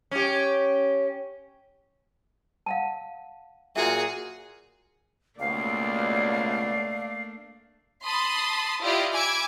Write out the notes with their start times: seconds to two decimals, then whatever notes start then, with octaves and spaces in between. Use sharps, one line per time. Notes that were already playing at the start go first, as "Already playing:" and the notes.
0.11 C#4 G4
2.66 F5 F#5 A5
3.76 A#2 F#3 F#4 G#4 E5
5.40 C#2 B2 A3 A#3 D4 D5 F5
8.04 A5 B5 C6 D#6
8.81 E4 F4 G4 D5 D#5
9.13 G#5 B5 D6 E6 G#6